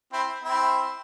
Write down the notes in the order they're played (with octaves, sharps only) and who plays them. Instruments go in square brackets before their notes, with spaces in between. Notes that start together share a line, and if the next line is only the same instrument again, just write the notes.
[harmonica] C4 E4
C4 E4